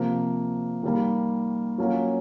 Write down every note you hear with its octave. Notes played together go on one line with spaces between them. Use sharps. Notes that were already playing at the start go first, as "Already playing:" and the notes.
Already playing: C3 F3 A#3
D#3 G3 A#3
F#3 A#3 C#4 F4